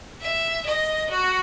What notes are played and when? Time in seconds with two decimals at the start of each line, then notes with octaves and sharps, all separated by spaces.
0.22 E5
0.66 D#5
1.10 F#4